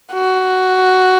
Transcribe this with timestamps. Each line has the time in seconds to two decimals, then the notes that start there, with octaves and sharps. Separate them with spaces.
0.13 F#4